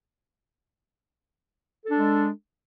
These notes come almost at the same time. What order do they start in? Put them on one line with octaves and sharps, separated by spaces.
A4 D4 G#3